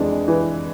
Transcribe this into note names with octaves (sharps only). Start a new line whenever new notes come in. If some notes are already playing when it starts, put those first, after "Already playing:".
Already playing: F2 E3 G#3 D4
E3